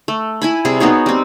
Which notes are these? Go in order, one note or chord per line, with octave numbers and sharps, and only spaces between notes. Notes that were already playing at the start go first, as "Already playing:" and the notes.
A3
E4 G#5 B5
C3 G3 G#4
B3 D#4 F#4 C#5
G3 C4